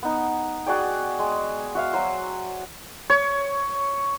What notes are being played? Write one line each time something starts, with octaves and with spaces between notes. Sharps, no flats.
B3 D#4
F#4 G#4 D5 G5
G#3
F#4 E5 F5
F#3 C5
C#5